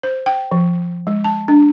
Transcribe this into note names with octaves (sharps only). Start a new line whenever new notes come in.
C5
G5
F3
G#3
A5
D4